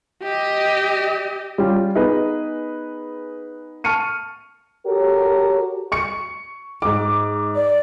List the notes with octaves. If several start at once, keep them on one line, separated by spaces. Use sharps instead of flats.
G4 D#5
G3 C#4 F4 G4
B3 D#4 G#4 B4
A5 C#6 F6 C#7 D#7
F#4 G4 A4 A#4 C#5
C#6 C#7
G#2 D6
D5